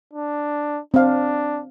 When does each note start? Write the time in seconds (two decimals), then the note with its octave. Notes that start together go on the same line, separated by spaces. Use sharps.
0.13 D4
0.94 C4 D4 F5